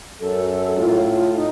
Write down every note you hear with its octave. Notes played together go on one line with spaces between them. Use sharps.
F#2 A4
A2 F4
D#4